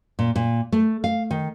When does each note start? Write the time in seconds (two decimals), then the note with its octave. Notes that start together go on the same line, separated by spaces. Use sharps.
0.19 A#2
0.36 A#2
0.72 A3
1.04 F5
1.31 D#3